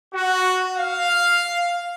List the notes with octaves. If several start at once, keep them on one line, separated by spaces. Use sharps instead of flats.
F#4
F5